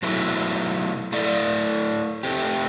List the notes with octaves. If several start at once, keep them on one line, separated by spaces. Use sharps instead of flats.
B2 F#3 A3 E4 B4
A3 E4 A4 D5
A3 C4 G4